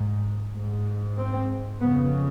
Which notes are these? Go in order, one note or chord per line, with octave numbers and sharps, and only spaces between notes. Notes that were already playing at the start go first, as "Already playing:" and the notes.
Already playing: G#2
G#2
C4
F2 C#3 B3